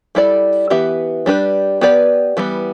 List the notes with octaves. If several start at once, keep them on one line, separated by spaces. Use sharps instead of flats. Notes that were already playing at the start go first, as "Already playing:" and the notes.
G3 E4 A4 D5
E3 B3 G4 E5
G3 D4 G4 B4
B3 G4 B4 D5
E3 G3 B3